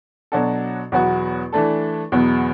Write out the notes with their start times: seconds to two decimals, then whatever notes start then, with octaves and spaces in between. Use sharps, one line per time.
0.32 B2 F#3 D4 F#4 A4
0.92 E2 B2 F#3 B3 F#4
1.53 E3 A3 D4 A4
2.12 E2 B2 F#3 B3